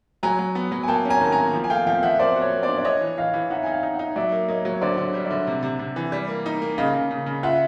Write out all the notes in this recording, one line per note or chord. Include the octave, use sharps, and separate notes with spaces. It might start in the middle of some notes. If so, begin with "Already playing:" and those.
F#3 G#5 A#5
F#3
B3
F#3
G#5
A#3 G5 A5
C#4
G#5 A#5
D#3 A5
G#5 A#5
A#3
F3
G#5
A3 F5 G5
F3 F5 G5
F3 E5 F#5
A#3 C5 D5
F#4
C#5
A#3
C5 D5
D4
D5
D4 C#5 D#5
E3
E3 D#5 F5
E3
D#4 E5 F#5
D#4 G#5
F5 G5
D#4
E5 F#5
D#4
F#3 D5 E5
A#3
A#3 C#5 D#5
F#3
C#5
D3 C5 D5
D5
D3
C#5
G3
D5 E5
D3
C3
C3
C3
E3
G3
A#3
D#4
A#3
C#3 D#5 F5
C#3
C#3
C#3
F4 E5 F#5